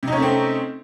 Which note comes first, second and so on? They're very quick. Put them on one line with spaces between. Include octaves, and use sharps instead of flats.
C3 D#4 C#4 A3 C4